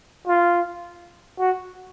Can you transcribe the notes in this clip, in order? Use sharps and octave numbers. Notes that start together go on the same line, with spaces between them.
F4
F#4